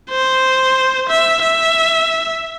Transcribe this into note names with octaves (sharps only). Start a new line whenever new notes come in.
C5
E5
E5